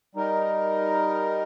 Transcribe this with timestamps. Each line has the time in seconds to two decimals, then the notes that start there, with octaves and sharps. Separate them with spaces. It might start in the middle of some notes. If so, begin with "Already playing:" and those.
0.15 G3 D#4 A#4 D#5